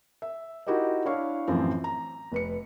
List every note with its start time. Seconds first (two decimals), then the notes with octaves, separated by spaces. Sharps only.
0.22 E5
0.67 D#4 E4 F#4 G4 A#4 D#5
1.05 D4 E4 C#5 F5 C#6
1.48 F#2 A2 E3 F3 C4
1.84 A#5
2.32 F1 B4 C#7